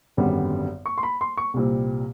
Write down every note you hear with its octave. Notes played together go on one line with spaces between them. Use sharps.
G#1 F#2 D3 G3 B3
C#6
C6
B5
C6
C#6
C2 A#2 G3 C4